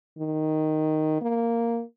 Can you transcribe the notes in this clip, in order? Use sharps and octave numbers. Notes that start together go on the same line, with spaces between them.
D#3
A#3